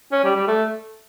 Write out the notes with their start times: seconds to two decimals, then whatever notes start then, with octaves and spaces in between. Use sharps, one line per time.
0.12 C#4
0.24 G3
0.35 G3
0.47 A3